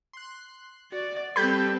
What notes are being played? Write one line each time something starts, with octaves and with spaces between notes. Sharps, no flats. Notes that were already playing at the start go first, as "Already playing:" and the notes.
C6 F#6
F#4 D5
G3 C4 G4 A4 B4 B5 G6